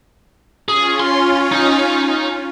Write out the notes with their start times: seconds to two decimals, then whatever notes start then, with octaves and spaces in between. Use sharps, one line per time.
0.69 C#4 F4 G#4
1.00 C6
1.52 D#4